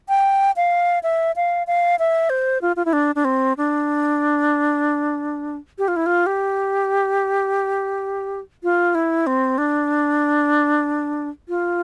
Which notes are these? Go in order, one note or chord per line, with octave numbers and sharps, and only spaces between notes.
G5
F5
E5
F5
F5
E5
C5
F4
F4
E4
D4
D4
C4
D4
G4
F4
E4
F4
G4
F4
E4
C4
D4
F4